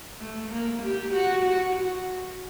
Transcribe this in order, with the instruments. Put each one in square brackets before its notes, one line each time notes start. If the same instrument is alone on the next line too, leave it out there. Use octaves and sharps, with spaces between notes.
[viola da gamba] A3
A#3
G4
F#4
F#4
F#4